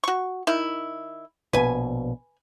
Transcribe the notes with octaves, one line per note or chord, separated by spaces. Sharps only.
F#4 C#6
D#3 E4
A#1 B2 B4 G#5